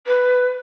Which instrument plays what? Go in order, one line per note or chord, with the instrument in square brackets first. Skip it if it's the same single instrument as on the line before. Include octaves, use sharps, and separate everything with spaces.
[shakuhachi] B4